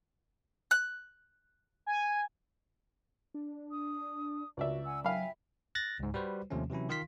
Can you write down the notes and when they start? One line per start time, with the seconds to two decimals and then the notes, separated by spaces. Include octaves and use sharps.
0.71 F#6
1.86 G#5
3.34 D4
3.70 D#6
4.57 C#2 F#4 D5 E5
4.84 F#5 G#5 E6
5.05 F#3 E5 F5 G5 G#5 B5
5.75 F#6 A6 A#6
5.99 C#2 G#2
6.14 G3 F#4 B4 C5
6.50 D#2 C3 F3 A3 C#4
6.70 C3 E3 F#3 C#4 E4
6.89 D#3 F4 F5 C6 B6